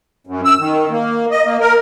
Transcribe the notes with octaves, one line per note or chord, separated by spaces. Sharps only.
F#2
E6
D#3
A#3
D#5
A#3
A#4